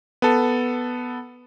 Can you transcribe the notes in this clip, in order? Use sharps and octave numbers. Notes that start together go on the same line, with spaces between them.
B3 A4